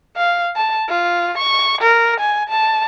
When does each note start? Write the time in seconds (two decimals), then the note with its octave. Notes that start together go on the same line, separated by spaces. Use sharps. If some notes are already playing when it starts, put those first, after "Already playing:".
0.17 F5
0.56 A5
0.88 F4
1.38 C#6
1.81 A#4
2.20 G#5
2.49 A5